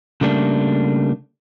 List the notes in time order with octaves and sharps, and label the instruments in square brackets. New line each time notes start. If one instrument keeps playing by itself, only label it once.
[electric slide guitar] C#3 G3 A3 A#3 D4